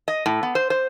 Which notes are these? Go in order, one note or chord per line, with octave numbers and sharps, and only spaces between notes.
D#5
A2
B3
C5
C5